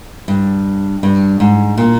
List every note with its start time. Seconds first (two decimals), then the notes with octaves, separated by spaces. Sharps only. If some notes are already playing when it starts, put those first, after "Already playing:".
0.28 G2
1.03 G2
1.40 G#2
1.77 A#2